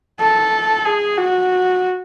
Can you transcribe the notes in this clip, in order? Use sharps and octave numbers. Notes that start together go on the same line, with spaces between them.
A4
G#4
F#4